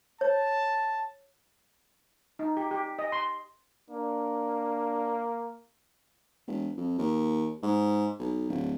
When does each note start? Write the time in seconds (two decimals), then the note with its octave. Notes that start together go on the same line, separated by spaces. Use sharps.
0.21 C#5 A5
2.39 D#4
2.57 G4
2.71 G4
2.99 D#5
3.12 C6
3.90 A#3 D4
6.47 E1
6.78 F2
6.98 D#2
7.62 G#2
8.19 B1
8.49 D1